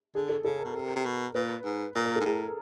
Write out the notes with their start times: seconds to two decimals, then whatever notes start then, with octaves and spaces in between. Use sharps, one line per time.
0.15 D3 G#4
0.29 A4
0.44 C#3 A4
0.60 B2 A#4
0.75 C3
0.96 C3
1.06 B2
1.35 A#2 B4
1.65 G#2
1.95 A#2 A#4
2.06 A#4
2.16 A4
2.21 G#2
2.25 A2 G#4